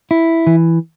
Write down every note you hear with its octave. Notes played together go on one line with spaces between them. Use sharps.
E4
E3